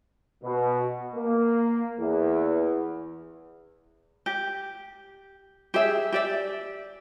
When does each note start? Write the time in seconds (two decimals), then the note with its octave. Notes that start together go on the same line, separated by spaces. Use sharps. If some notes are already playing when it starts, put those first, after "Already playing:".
0.44 B2
1.16 A#3
2.00 E2
4.26 G4
5.74 G4 G#4 E5
6.12 G4 D5 E5